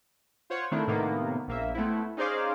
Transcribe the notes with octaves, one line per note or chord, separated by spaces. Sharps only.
F4 C5 C#5 F#5
D#3 A3 A#3 C4 D4 E4
A2 C3 D#3 A#3 B3
A#1 A#3 E5
A3 B3 C4 E4
C#4 D#4 G#4 C5 D5 F5